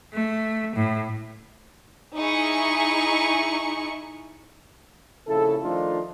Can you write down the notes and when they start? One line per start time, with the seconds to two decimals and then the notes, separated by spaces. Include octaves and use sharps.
0.14 A3
0.76 A2
2.18 D#4 E4 G#4 C#6
5.27 A#1 C#3 E4 A4
5.62 D#3 F3 A3 D4 D#4 F4